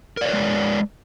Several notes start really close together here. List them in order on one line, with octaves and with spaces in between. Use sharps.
A#4 D5 C#5 B4 G#3